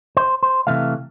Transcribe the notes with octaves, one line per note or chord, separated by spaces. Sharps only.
C5
C5
C3 E3 A3 F5